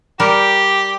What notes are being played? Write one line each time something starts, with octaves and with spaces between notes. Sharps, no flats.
G3 G4 A#4